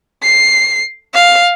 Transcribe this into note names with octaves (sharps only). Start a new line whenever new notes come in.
C7
F5